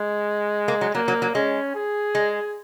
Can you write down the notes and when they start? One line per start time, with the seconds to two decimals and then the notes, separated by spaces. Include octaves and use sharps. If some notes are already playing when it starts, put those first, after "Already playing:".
Already playing: G#3
0.68 A#3
0.81 F#3
0.95 F#3 A#3
1.08 F#3
1.22 F#3
1.35 G#3 C#4
1.75 G#4
2.15 G#3